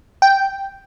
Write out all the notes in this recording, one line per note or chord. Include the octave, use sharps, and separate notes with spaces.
G5